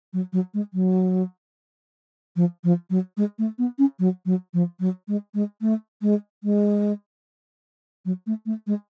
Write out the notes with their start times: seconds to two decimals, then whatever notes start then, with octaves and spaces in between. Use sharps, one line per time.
0.13 F#3
0.33 F#3
0.54 G#3
0.74 F#3
2.36 F3
2.64 F3
2.90 F#3
3.17 G#3
3.39 A3
3.58 B3
3.79 C#4
3.99 F#3
4.26 F#3
4.54 F3
4.80 F#3
5.08 G#3
5.34 G#3
5.61 A3
6.02 G#3
6.44 G#3
8.05 F#3
8.27 A3
8.46 A3
8.67 G#3